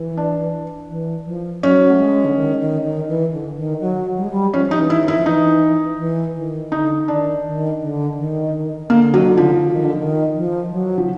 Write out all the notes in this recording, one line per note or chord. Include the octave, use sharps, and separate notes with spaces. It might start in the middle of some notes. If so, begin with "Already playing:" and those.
Already playing: E3
D4
E3
F3
F#3 C#4
A3
G#3
D3
D#3
D#3
D#3
E3
D3
D#3
F#3
G3
G#3
G3
F3 C#4
D#4
E3
E4
D#3
E4
F3
E3 D#4
E3
D#3
D3 D#4
D#3 D4
D#3
D3
D#3
D3 A#3
F#3
D#3
D3
F3
D3
D#3
D3
D#3
F3
F#3
F3